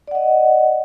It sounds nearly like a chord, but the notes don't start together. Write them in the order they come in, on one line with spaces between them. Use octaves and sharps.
D5 F#5 D#5